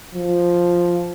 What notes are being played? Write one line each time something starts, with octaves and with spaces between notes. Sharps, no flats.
F3